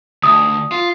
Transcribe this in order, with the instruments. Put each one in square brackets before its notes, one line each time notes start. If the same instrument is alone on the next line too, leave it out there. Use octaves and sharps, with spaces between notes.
[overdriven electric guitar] D2 [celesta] D#6
[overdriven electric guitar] F4